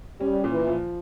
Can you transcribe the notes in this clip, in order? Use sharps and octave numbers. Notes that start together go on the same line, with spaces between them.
G3 C#4
A#2
E3
F3